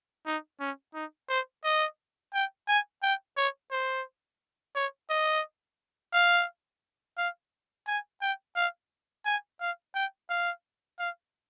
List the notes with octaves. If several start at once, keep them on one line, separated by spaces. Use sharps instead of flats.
D#4
C#4
D#4
C5
D#5
G5
G#5
G5
C#5
C5
C#5
D#5
F5
F5
G#5
G5
F5
G#5
F5
G5
F5
F5